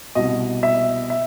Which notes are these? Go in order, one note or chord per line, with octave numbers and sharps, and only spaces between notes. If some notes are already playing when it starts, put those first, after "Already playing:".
C2 B2 D#5
E5
E5